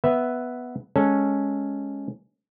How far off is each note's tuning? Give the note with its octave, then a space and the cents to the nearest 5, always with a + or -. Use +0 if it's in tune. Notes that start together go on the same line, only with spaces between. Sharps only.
B3 +0 B4 +0 E5 +0
G#3 +0 C#4 +0 A4 +0